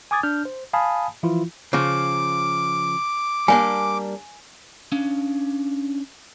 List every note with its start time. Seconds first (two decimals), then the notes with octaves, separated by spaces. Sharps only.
0.11 G#5 D6 D#6 G#6 A6
0.23 D4 F6 G6
0.45 C5
0.73 F5 G#5 A5 B5 D#6
1.23 E3 F3 E4 F4
1.73 C#3 F3 D6
3.48 G3 A#3 D4 G#5
4.92 C#4 D4 F5